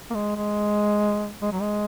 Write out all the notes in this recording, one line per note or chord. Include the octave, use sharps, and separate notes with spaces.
A#3
G#3
G#3
G#3
F#3
G#3